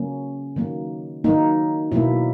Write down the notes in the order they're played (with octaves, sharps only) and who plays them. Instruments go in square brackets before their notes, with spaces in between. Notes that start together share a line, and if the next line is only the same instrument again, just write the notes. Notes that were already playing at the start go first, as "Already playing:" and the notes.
Already playing: [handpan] C#3 F#3 A#3 C#4
D#3 F#3 A#3
D#3 F#3 A#3 D#4
B2 F#3 A#3 E4